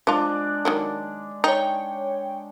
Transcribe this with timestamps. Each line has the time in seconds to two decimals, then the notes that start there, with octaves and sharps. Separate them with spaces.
0.07 F3 G#3 D4 F4 D5
0.65 D#3 F#3 A#3
1.44 D#4 C#5 G5